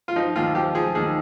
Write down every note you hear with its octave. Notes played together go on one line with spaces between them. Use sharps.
F4
F3 D#4
D#2 F4
F3 G4
F3 G#4
D#2 G#4